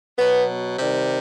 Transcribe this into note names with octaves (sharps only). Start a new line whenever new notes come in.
B2 F#3 B3
C3 D#3 G3